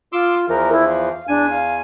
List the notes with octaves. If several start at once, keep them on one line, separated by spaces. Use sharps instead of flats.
F4 C6 D6 E6
E2 E3 F3 A#4
E4
F5
E2 D4 G#5
F5